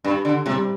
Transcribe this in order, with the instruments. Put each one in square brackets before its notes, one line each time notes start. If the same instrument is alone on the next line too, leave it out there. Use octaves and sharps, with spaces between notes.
[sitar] G2 [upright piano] G4
[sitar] D3
[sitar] C3 [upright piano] G3